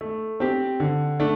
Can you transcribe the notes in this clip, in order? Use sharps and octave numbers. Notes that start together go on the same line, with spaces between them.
A3
C4 G4
D3
A3 D4